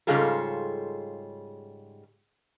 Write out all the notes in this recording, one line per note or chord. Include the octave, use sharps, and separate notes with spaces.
G#2 C#3 G3 F4 G#4 A4